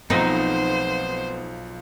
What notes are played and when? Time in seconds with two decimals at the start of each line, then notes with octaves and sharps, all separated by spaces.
0.10 B1 F3 A3 B3 C4 D#4 C5